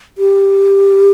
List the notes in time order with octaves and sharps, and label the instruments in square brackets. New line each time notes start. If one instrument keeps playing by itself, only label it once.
[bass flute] G4